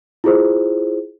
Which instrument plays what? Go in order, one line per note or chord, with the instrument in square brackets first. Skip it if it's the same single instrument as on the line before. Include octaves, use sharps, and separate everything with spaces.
[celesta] E4 F4 G#4 C5